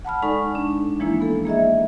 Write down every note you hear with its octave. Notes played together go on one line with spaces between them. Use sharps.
F#5 A5 B5 F6
G#3 D#4 A4 D5 C#6
D4
E3 F3 G#3 A#3 D4 E4
B3 A4
A#3 G#4 D#5 E5